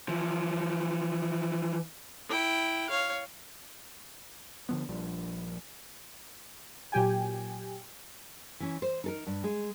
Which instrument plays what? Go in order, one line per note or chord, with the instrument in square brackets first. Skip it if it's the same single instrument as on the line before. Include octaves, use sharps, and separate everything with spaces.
[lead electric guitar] E3 F3
[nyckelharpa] E4 G5
C#5 F5
[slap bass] D3 F3 B3
A#1 F3 G3
[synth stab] A#2 F#3 G4 G5 G#5
[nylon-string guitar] E3 C#4
C5
D#4 A4 A#4
G2
G#3